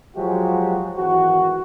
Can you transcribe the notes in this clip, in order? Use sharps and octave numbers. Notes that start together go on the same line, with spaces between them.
F3 F#3 G#3 F#4 G4
G#1 E3 F#4